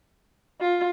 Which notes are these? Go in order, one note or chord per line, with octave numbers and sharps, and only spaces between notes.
F4